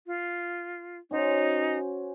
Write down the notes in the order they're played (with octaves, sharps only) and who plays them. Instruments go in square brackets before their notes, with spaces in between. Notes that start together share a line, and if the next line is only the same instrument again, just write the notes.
[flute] F4
[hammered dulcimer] C#4 F#4 C5 [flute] D#4